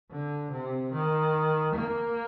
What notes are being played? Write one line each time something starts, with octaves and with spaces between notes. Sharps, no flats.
D3
C3
D#3
A#3